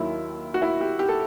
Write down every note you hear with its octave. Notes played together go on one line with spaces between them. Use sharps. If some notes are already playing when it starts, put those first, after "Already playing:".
Already playing: D#2 D#3 F#3 E4
F#4
E4
G4
G4
A4